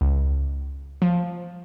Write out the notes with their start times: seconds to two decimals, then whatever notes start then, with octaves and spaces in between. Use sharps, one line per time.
0.01 C#2
1.02 F3